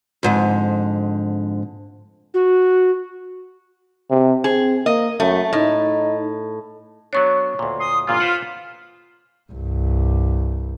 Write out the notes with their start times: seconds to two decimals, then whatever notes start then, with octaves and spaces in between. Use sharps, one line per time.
0.23 F2 G#2 D3
2.34 F#4
4.10 C3
4.44 C4 G#4
4.86 A#3 D#5
5.20 F#2 A3
5.53 A2 D#4
7.13 F#3 B3 D4 C#5 C#6
7.59 D2 A#2
7.80 C6 D#6
8.07 G1 A#2 E3 F4
8.20 B4 C5 F#5
9.52 C2 G2